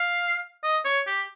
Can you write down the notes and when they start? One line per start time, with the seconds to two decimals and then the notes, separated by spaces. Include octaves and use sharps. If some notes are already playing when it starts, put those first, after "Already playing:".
Already playing: F5
0.63 D#5
0.85 C#5
1.07 G4